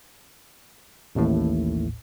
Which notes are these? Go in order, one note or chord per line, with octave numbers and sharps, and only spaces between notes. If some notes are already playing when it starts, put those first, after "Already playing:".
A1 D#2 A2